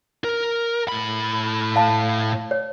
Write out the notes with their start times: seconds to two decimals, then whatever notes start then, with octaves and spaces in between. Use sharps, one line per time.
0.24 A#4
0.88 A2 B5
1.76 F5 A5
2.51 C#5